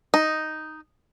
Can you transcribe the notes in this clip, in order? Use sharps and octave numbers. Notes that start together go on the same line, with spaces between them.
D#4